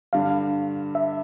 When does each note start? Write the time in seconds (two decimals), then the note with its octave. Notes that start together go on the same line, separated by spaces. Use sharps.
0.13 G2 D3 G3 F5
0.95 E5